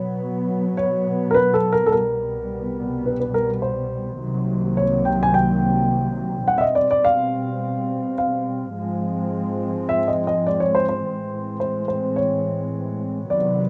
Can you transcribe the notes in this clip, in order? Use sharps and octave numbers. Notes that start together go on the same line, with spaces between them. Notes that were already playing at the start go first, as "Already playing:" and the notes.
Already playing: B2 F#3 B3 C#5
C#5
A#4
B4
A4
A#4
A4
C2 B2 G3 B3 A#4
B4
B4
A#4
C5
C2 C3 D#3 F#3 A#3
C#5
G5
G#5
G5
B2 G3 C4 F#5
E5
D#5
D5
D5
F5
F5
G#2 F3 G#3 C4
E5
D#5
D#5
D5
C#5
C5
C5
A2 E3 G#3 C4
C5
C5
C#5
C3 D#3 F#3 B3 D5